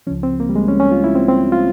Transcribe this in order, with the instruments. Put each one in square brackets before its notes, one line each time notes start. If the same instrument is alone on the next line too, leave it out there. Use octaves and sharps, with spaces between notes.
[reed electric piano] C#2 C#3 F3 C#4
C4
A#3
G3
G#3
C#4
C#4
F4
E4
C4
C4
F4